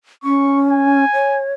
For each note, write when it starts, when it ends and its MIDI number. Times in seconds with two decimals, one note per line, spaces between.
0.24 1.05 61
0.24 0.60 85
0.70 1.40 80
1.14 1.53 73